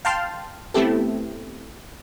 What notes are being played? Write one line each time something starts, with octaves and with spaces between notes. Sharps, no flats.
F5 G5 A5 C6 F6
A3 B3 C4 E4 G4 A4